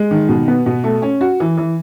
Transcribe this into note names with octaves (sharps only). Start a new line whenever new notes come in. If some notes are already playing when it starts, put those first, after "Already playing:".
Already playing: G#3
D#3
B2
B3
B2
A3
C#4
F#4
E3
E3